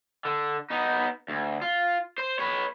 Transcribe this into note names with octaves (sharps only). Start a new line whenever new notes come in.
D3
B3 D#4
D2
F4
C5
B4 C#5